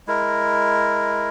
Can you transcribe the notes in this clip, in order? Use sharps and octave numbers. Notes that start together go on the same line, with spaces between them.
G#3 E4 A#4